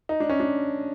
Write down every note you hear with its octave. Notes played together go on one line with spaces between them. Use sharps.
D#4
D4
C#4
D4